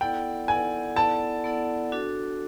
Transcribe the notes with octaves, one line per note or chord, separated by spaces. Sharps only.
B3 E4 A4 D5 F#5 G5
B3 E4 A4 D5 F#5 G#5
B3 E4 A4 D5 F#5 A5
B3 E4 A4 D5 F#5
D4 F#4 A4